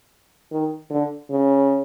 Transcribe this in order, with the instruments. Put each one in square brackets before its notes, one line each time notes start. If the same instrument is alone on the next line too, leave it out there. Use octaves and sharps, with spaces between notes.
[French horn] D#3
D3
C#3